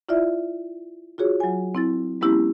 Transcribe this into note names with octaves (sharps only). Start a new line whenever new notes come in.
E4 F4 D5 E5
F4 F#4 G#4 C#5
F#3 G#5
C4 E4 A6
G#3 B3 C#4 E4 G4